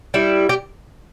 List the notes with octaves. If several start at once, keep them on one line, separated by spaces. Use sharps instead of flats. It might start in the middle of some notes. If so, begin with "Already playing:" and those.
G3 E4
G4